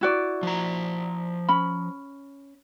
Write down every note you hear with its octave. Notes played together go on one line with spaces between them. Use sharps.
E4 F#4 D5
F3 A#5
C#4 B5